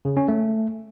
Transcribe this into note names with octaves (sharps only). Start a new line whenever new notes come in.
C#3
C#4
A3